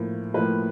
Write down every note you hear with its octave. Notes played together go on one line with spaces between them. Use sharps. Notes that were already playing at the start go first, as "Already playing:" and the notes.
Already playing: A2 F3 A#3
A2 F3 A#3 B4